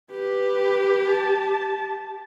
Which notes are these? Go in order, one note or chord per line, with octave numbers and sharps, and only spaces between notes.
G4 B4
A5